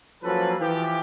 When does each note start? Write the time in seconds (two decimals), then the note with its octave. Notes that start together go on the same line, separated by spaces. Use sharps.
0.23 F3 F#3 A#3 C#4 A4 B4
0.60 E3 F3 G4